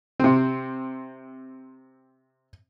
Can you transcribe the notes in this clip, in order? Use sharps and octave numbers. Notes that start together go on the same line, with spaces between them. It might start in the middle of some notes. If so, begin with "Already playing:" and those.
C3 C4